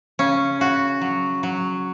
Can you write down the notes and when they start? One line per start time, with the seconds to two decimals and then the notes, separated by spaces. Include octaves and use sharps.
0.19 C#3 C#4
0.60 C#3 F#4
1.01 F#3
1.43 F#3